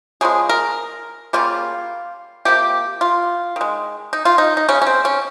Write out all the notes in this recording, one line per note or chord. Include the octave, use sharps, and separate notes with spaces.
C#3 F3 G#3 G#4
A#4
C#3 G3 A#3 F4
C3 F3 A#3 G4
F4
D#3 G#3
D#4
F4
D#4
D#4
C#3 G#3 C#4
C#4
C4
C#4